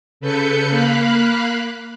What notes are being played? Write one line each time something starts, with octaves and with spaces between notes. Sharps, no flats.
C#3 A4 B4 G6 C#7
A#3 F5 B5 F#6